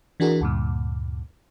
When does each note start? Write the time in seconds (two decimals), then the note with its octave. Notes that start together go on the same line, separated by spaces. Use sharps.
0.20 E3 D4 F#4 G#4 A#4
0.41 D2 G2 A#2